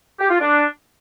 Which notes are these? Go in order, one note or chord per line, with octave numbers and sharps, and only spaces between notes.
G4
F4
D4